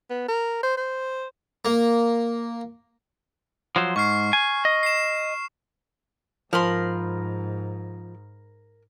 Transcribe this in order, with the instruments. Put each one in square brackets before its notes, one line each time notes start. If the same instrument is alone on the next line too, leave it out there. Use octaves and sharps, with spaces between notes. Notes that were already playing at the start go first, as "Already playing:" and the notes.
[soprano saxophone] B3
A#4
C5
C5
[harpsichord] A#3
[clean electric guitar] F3 F#3 C5
[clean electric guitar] G#2 [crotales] C#6 F6 C7
[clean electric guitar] G#5
D#5
[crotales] C7 E7
[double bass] G#2 [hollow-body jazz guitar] F3 [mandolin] A#4 B5 C6